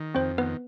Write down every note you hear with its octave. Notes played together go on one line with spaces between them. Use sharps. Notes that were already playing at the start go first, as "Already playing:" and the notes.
Already playing: D#3
F2 C4 C5
D#3 B3 B4